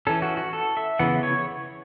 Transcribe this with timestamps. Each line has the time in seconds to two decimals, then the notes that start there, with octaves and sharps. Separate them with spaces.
0.07 E3 C#4 A4
0.22 F#4
0.37 F#4
0.53 A4
0.77 E5
0.99 C#3 E3 B3 F#5
1.23 C#5